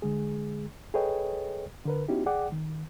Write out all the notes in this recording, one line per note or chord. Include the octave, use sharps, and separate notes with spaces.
D3 G#3 G#4
G#4 A4 B4 C#5 D#5 G5
D3 A#4 B4
B3 C#4 D#4 E4 F#4 G4
C2 G#4 D5 F#5 G5 D6
D#3